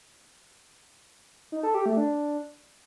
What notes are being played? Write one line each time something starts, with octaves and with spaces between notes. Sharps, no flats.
D#4
A4
G4
A3
D4